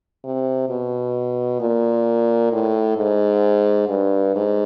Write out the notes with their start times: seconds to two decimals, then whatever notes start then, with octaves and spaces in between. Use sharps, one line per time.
0.24 C3
0.69 B2
1.61 A#2
2.53 A2
2.97 G#2
3.88 G2
4.35 G#2